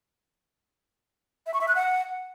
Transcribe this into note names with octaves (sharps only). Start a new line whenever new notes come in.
E5
C#6
E5
F#6
F#5